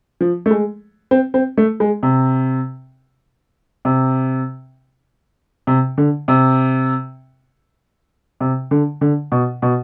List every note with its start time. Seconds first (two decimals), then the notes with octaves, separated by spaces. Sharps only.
0.21 F3
0.46 A3
0.51 G#3
1.11 C4
1.34 C4
1.57 A3
1.80 G#3
2.03 C3
3.85 C3
5.67 C3
5.98 D3
6.28 C3
8.40 C3
8.71 D3
9.01 D3
9.32 B2
9.62 B2